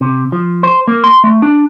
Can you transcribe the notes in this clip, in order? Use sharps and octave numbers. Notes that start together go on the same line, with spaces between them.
C3
F3
C5
A#3
C6
A3
D4